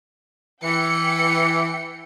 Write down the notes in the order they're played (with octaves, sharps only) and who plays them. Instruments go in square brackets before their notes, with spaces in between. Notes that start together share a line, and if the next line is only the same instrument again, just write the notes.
[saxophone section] E3 [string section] G5 C#7